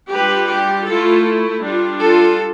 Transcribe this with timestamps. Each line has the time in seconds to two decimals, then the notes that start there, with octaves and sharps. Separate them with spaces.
0.13 G3 D4 F4 G4 B4
0.51 G4
0.88 A3 E4 F4 A4
1.63 G3 D4 F4
2.00 F4 A4